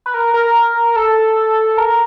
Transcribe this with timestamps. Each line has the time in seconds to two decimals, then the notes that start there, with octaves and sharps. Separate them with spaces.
0.06 B4
0.14 A#4
0.34 A#4
0.96 A4
1.78 A#4